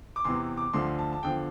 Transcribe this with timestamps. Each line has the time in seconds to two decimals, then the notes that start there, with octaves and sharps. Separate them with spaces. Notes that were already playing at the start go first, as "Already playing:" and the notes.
0.16 D6
0.24 E2 C3 E3 C6
0.57 D6
0.73 D2 D3 F3 C6
0.99 A5
1.13 A5
1.23 E2 D3 F3 G5